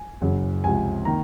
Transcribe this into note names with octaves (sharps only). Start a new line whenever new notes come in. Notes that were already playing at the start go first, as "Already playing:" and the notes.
Already playing: G#5
F#1 F#2 C#3
C#2 C3 F3 G#5
D#3 A#3 A#5